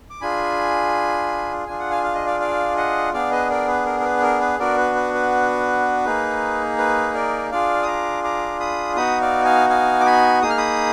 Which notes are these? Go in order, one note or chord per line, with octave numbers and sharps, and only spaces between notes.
D6
D4 F4 G#4 G#5 B5
D4 F4 G#4 G#5
F#5
F5 G#5
F5
D#5
D5 F5
D5 F5
D#5 F#5
B3 D4 G#4 D5 F5
B4 D#5
A#4 D5
B4
A#4
A#4
B4
A#4
B4
B3 D4 F#4 A#4 D5
B4
B4
B4
A#3 D#4 G#4
B4
A#4 D5
D4 F4 G#4 D5 F5
D#6
A#5 D6
A#5 D6
B5 D#6
B3 D#4 F#4 B5 D#6
D5 F5
F5 G#5
F5 G#5
D6
G#5 B5
A#3 D#4 G#4 D#6
F6
B5 D#6